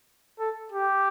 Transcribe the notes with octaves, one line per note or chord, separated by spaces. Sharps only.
A4
G4